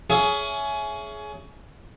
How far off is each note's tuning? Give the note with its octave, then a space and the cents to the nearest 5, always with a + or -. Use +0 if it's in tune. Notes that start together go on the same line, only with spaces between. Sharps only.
C#4 +20 G#4 +20 E5 +15